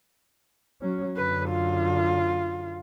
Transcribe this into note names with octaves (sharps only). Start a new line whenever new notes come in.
F#3 C#4
F#2 D3 B4
F4